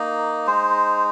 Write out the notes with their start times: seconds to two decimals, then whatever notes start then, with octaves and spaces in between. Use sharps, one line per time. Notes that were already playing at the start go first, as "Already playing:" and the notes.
Already playing: A#3 D#4
0.47 G#3 D#4 C5